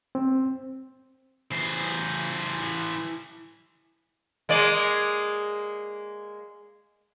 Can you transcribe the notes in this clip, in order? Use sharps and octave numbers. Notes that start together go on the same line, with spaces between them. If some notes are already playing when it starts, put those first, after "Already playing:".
C4
E3 C5
G#3 A#3 D5